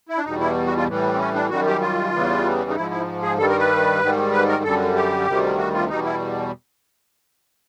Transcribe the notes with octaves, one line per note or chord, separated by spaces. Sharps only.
E4
D4
E2 B2 G3 D#4
E4
F#4
F4
A2 E3 G3
C4
C#4
D4
F#2 D#3 G3 F#4
G4
F4
E2 C#3 E3 G3
D#4
G#2 F3 E4
E4
G#4
G2 D#3 G3 A4
A#4
B4
G#2 D#3 G3
B4
A#4
F#2 D3 G3 A4
G4
D2 C3 D#3 G3
F#4
F4
E2 B2 G3 D#4
E4